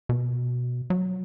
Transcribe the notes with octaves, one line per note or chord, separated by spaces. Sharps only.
B2
F#3